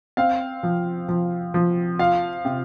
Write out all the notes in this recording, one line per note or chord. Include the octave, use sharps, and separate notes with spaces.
C4 F5
F3
F3
F3
F4 F5
C3